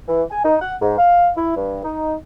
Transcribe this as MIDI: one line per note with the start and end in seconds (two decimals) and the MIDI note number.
0.08 0.23 52
0.31 0.41 80
0.44 0.55 63
0.61 0.74 78
0.81 0.97 44
0.98 1.29 77
1.36 1.54 64
1.55 1.81 43
1.84 2.14 63